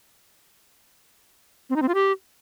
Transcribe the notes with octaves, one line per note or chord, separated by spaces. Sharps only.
C4
D#4
C4
F4
G4